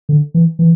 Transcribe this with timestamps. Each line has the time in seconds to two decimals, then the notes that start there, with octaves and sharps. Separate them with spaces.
0.09 D3
0.34 E3
0.59 E3